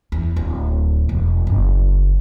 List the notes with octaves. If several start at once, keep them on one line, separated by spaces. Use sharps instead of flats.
E2
D1
E1
F#1